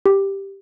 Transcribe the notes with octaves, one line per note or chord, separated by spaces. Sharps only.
G4